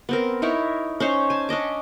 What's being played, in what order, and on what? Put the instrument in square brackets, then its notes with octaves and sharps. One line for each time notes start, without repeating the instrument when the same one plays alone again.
[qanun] B3 C4 A#4
D#4 E4 A#4 C#5
C#4 D#4 C5 C#5
G#5 A5
C#4 D4 D#5 D6